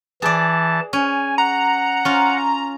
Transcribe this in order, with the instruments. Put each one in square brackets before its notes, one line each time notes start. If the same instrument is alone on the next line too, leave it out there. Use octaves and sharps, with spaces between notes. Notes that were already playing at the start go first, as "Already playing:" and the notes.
[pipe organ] E3 A5 [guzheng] G#4 D5
[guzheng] C#4 [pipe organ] G#5
[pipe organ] F#5 [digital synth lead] A#5
[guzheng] C#4 F4